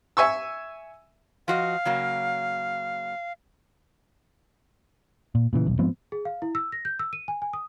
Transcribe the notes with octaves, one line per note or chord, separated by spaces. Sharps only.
E5 G#5 C#6 E6
F3 F#4 D#5 F5
C#3 F#3 A#3
A#2
A#2 C#3 E3
D#1 B1
G#2 F3 B3 C4
G#4
F5
E4
E6
A#6
G6
E6
D#7
G#5
G#5
D#6